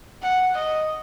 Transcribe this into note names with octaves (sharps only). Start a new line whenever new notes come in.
F#5
D#5